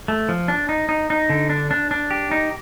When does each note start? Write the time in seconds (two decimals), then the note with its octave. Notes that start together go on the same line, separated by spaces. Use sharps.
0.08 A3
0.29 F3
0.48 D4
0.69 D#4
0.89 D#4
1.10 D#4
1.30 D3
1.50 D4
1.71 D4
1.91 D4
2.11 G4
2.31 D#4